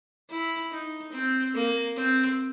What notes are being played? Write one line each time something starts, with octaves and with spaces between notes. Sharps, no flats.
E4
D#4
C4
A#3
C4